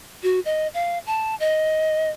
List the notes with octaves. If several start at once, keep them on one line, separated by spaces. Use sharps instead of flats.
F#4
D#5
F5
A5
D#5